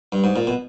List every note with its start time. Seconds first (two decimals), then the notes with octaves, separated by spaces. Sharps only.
0.12 G2
0.24 G#2
0.36 A#2
0.47 B2